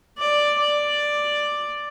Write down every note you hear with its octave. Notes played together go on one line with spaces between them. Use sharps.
D5
D5